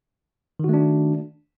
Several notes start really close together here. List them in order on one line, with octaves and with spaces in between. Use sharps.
D#3 F#4 A3 D4